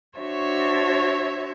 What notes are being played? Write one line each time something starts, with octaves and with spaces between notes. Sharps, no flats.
D4 F#4 C5 C#5 E5